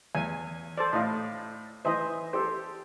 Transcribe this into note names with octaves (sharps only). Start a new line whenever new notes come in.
E2 G#5
A4 C5 D5
A2 D#5 F5
E3 C5 D#5 E5
G4 A4 C5